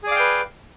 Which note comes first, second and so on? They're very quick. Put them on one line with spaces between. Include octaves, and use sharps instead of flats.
G#4 D5 F5 G5 B4